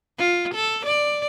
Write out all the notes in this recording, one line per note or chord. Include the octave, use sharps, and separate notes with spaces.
F4
A4
D5